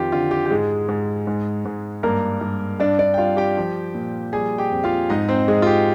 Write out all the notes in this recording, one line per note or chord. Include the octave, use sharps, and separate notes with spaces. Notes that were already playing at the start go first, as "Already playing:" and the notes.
Already playing: F2 D#3 F4 G4
D3 F4
G4
G4
G#2 G#3 G#4
G#2
G#2
G#2
G2 A#3 A#4
G2
G2 D4 D5
D4 D5
G5
G3 F4 F5
G4 G5
F3
A#2
G3 G#4 G#5
G4 G5
F2
F4 F5
G#2 D#4 D#5
C4 C5
G#2 G#3 G#4
F4
G4